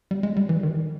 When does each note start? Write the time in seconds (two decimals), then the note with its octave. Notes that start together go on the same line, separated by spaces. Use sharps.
0.11 G3
0.23 G#3
0.37 G3
0.49 E3
0.63 D#3